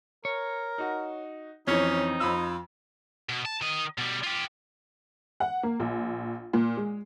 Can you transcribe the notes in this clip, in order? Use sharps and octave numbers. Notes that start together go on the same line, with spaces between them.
A#4 C#5
D#4 F#4
F2 E3 C4 C#4 D#4 C#5
F2 F4 B5 E6
B2
A5
D#3 D#5
B2 G3
F4 G4
F#5
A#3
A#1
A#2
G#3